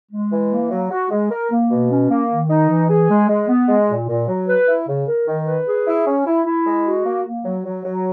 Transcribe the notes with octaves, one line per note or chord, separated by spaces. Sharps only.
G#3
E3
A#3
F#3
F#4
G#3
A#4
A#3
B2
C#4
A#3
D#3
D#4
E3
G#4
G#3
G#3
B3
G#3
A#2
A#2
F#3
B4
E4
C#3
A#4
D#3
B4
G#4
E4
C#4
E4
E4
G#3
F#4
A#3
A#3
F#3
F#3
F#3